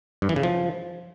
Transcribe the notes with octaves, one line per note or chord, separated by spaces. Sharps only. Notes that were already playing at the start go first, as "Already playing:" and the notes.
G2
E3
C#3
F3